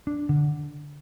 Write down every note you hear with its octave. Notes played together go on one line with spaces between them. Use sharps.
D4
D3